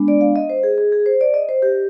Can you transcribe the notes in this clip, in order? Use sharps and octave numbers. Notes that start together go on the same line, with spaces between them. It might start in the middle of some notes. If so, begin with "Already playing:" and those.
Already playing: G#3 B3 D4
D5
F5
D#5
C5
G#4
G#4
G#4
C5
D5
D#5
C5
G4